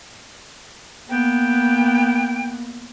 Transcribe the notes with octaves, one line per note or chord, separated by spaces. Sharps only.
A#3 B3 G5